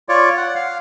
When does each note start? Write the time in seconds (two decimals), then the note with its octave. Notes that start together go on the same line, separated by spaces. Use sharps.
0.09 F4 C#5 D5
0.37 F#5
0.55 F5